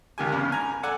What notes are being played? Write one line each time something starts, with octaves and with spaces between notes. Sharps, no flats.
C#2 D#3 G4 G#5
E2 G2 C#3
G#5 A#5
A4 D5 F#5 G#5